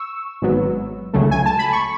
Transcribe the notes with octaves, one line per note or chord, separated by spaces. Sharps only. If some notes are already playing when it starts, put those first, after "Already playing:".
Already playing: C#6 E6
G#1 G#2 F#3 B3
C#2 C#3 F#3 A3
G#5
A5
B5
C#6